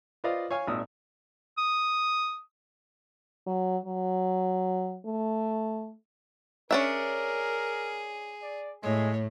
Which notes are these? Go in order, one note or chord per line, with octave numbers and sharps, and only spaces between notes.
F4 B4 C5 D5 D#5 F5
C#5 F5 G#5 F6
G#1 A#2 D#6 E6
D#6
F#3
F#3
A3
C#4 D4 G#4 A#4 E5
D5
A2 G#3 C#5